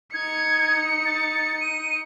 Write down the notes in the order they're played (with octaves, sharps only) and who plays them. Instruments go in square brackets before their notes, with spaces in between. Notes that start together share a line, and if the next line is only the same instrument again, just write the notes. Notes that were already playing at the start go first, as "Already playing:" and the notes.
[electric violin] D#4 C#7 [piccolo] G#6
[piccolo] A6
D#7